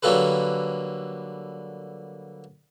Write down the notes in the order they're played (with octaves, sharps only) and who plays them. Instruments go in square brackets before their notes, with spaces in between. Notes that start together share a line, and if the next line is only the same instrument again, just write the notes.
[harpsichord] D3 F#3 G3 A#3 A4 B4